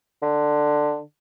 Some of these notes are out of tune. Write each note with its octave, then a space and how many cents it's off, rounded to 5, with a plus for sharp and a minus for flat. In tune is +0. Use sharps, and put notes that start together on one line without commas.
D3 +15